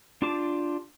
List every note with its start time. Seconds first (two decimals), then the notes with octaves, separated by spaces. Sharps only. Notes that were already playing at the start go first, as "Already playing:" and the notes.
0.22 D4 F4 G4 A5 D6